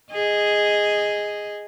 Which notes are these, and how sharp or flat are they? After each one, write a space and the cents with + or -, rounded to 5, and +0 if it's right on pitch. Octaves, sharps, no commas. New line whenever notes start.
G#4 -5 D#5 +0